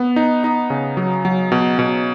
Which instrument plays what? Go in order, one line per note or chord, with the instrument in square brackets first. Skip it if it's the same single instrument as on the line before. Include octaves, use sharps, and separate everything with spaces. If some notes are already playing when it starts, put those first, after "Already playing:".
Already playing: [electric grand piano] B3
D#4
D#4
C#3
F#3
F#3
B2
B2